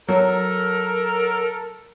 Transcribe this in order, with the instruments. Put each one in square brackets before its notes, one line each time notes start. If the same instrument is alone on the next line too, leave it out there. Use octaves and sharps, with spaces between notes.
[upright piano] F#3 [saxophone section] A4 A#4